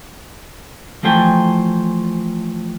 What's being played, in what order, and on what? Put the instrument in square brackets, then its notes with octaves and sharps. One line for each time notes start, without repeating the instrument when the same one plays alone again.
[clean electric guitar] E3 F3 A3 C5 G5 G#5